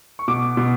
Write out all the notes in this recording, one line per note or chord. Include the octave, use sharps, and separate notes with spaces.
C#6
B2 D6
B2